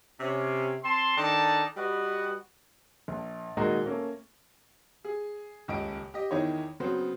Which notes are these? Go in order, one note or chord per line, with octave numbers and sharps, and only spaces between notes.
C3 C#4
C4 A5 C6
D#3 D4 D#4 A4 A5
G3 F#4 B4 D#5 F#5
A#1
A#2 D#3 G#3 D#4 F#4 A#4
A3 A#3 C#4 A4
G#4
D#1 C#2 D#5 D7
G4 D#5
E2 D#3 D#4 E4 C#5
C#3 F#3 B3 C4 C5